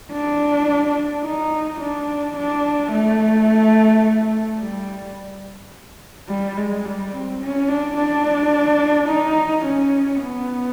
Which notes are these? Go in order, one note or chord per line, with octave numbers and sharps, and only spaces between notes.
D4
D#4
D4
D4
A3
G3
G3
G#3
G3
C4
C#4
D4
D4
D#4
C#4
B3